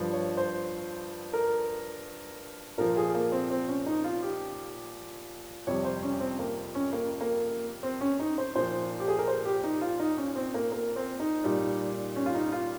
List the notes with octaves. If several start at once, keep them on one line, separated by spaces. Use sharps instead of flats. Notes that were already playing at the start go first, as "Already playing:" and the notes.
Already playing: G2 F3
C#5
C5
A#4
A#2 F3 A#4
G#4
A#3
C4
C4
C#4
D#4
F4
G4
F2 C3 G3 C#5
C5
C#4
C4
A#3
C#4
A#3
A#3
C4
C#4
D#4
C5
A#2 F3 C5
G4
G#4
A#4
C5
G4
D#4
F4
D#4
C#4
C4
A#3
A#3
C4
D#4
A#2 G3
C#4
F4
D#4
F4